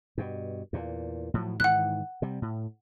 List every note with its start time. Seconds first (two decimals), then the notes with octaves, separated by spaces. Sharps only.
0.18 G2 B2
0.73 E2 A#2
1.34 A2 F3 F#3
1.60 G#2 D#3 E3 F#5 F#6
2.22 C3 G3
2.42 A2